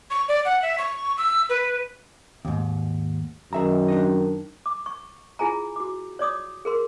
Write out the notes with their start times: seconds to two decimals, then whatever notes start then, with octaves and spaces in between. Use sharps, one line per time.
0.10 C#6
0.28 D5
0.45 F#5
0.62 E5
0.78 C#6
1.17 E6
1.49 B4
2.45 D#2 G#2
3.53 F#2 D#3 G#4 E5 A#5
3.88 D4 D#4 D#5
4.66 D6
4.86 C#6
5.39 E4 F4 G#4 G#5 A#5
5.76 F#4 D6
6.19 C#5 D5 D6 D#6
6.65 G#4 A#4 C6